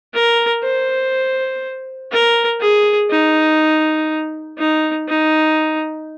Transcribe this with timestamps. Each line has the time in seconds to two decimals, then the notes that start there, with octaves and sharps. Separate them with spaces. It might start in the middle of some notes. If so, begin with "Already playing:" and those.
0.14 A#4
0.63 C5
2.12 A#4
2.61 G#4
3.10 D#4
4.58 D#4
5.08 D#4